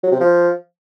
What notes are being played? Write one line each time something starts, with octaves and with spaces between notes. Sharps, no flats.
F#3
C3
F3